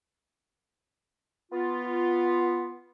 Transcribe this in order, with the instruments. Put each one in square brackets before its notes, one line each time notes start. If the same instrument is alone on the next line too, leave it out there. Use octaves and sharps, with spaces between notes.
[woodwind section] B3 F4